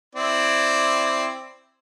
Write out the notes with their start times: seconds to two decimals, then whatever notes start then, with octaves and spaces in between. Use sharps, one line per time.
0.15 C4 E4 D5